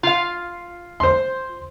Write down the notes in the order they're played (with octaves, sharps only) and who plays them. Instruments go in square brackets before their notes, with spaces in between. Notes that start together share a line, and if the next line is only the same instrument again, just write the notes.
[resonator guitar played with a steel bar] F4 F5
[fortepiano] C5 C6